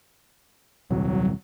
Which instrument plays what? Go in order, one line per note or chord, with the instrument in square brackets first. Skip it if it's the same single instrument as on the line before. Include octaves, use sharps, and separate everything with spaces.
[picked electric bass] D#1 C2 [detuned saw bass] F#3